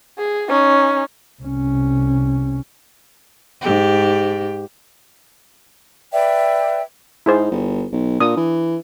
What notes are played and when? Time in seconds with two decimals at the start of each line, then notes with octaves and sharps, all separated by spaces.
0.18 G#4
0.49 C#4 D#4
1.42 C2 C#4
3.61 G#2 G4
6.12 B4 D5 E5 G5
7.26 G#2 E4 G#4 C5
7.51 G1
7.92 B1
8.20 A#2 D4 D#6
8.37 E3